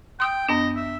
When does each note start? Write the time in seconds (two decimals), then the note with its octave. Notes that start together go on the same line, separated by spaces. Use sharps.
0.20 G5 C6 D#6 E6
0.49 F#2 B3 D4 D#5
0.76 E5